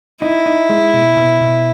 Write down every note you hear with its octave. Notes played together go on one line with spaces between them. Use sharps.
D#4 E4
D#4
G#3
B2
B2
B2